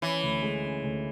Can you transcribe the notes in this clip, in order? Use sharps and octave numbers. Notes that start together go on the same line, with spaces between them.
E3 C#4
D2
G#3
C#4
D2